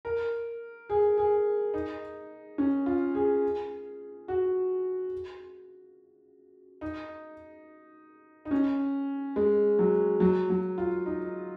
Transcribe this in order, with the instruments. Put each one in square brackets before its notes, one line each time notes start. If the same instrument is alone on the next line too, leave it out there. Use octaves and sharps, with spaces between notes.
[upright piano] A#4
G#4
G#4
D#4
C#4
F4
G#4
F#4
D#4
D#4
C#4
G#3
F#3
F#3
F#3
F4
D#4